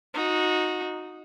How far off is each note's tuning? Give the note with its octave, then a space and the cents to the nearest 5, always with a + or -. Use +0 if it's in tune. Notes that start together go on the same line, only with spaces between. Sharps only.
D#4 +0 F#4 -25